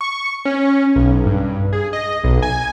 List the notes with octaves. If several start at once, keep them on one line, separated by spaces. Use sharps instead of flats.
C#6
C#4
B1
G2
G#4
D#5
B1
G#5